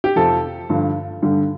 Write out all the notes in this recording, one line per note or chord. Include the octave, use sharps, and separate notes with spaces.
G4
F2 C3 F3 A4
G2 D3 F3
G2 D3 G3